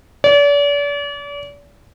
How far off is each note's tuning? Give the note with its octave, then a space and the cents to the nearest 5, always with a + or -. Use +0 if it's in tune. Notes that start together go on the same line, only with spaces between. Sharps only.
D5 -40